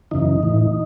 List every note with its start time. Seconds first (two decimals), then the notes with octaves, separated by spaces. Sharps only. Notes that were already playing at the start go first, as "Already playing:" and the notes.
0.11 F#2 C#3 E3 D#4
0.43 A2 E3